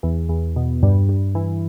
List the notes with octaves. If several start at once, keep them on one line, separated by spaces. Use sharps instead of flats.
E2
E2
B2
G2
G2
E3